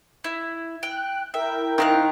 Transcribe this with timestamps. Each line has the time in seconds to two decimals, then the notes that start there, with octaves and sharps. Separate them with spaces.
0.24 E4
0.83 G5 F#6
1.34 E4 A#4 E5 G5
1.78 D#3 C4 F5 F#6